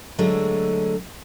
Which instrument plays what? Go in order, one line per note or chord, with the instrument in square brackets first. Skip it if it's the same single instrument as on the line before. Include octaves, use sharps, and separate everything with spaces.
[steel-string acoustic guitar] D3 F#3 G#3 A3